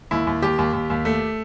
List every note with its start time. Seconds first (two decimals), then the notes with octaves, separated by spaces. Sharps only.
0.11 D#2 E4
0.27 D#2
0.42 D#2 G4
0.58 D#2
0.73 D#2
0.90 D#2
1.05 A3